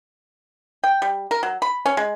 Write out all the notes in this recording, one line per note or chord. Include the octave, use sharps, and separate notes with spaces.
G5
G3
A#4
F#3
B5
C#4
G#3